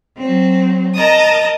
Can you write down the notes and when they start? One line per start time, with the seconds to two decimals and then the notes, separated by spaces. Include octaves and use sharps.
0.18 F#3 C4
0.95 A#4 D#5 A5 A#5 D#6